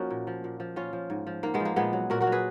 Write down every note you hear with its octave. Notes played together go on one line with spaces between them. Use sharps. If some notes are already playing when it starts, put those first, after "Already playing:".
Already playing: F3 A#3 C#4 D#4 F#4
A#2
F3
A#2
F3
A#2 C#4 F4
F3
G#2
F3
G#2 A#3
G#3 B3
F3
A#3
A#2 G#3 B3
F#3
A#2 F#4 A#4
F#4 A#4
F#3
G#4 B4